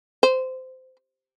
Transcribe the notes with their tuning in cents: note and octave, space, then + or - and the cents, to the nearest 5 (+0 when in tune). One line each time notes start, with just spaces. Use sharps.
C5 -20